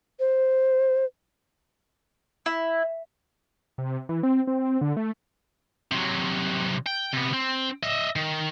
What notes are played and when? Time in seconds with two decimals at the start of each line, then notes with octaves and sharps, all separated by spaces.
0.20 C5
2.46 E4
3.78 C3
4.09 E3
4.23 C4
4.47 C4
4.81 D3
4.97 A3
5.91 C3 F#3
6.87 G5
7.13 C3 B3
7.33 C4
7.83 D#5 E5
8.16 D#3